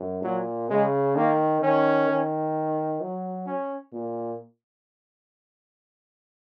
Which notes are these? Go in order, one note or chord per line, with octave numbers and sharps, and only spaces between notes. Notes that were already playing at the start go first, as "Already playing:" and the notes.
Already playing: F#2
A#2 F#3
C#3 G#3
D#3 A#3
D#3 C#4
D#3
F#3
C#4
A#2